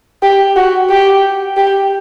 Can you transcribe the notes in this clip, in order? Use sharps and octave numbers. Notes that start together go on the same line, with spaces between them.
G4
F#4
G4
G4